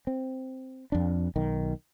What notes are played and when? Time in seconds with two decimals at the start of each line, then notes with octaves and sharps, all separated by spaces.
0.07 C4
0.92 F2 D4
1.36 B1 D#3